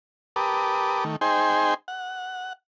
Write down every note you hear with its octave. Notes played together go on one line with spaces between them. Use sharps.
G4 A#4 B4 A5 D6 D#6
D#3 A3
D#4 G#4 C5 G5 G#5 C6
F#5